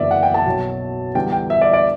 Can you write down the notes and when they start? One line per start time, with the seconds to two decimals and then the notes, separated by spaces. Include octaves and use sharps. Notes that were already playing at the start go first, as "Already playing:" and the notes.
Already playing: F#1 E2 D3 D5 E5
0.11 F#5
0.23 G5
0.34 A5
0.46 B1 B2 F#3
1.15 E2 D3 G3 G5
1.32 G5
1.50 E5
1.61 D5
1.73 D5